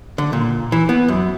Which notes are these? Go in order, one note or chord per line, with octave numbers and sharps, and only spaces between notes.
D3
A#2
E3
B3
F#2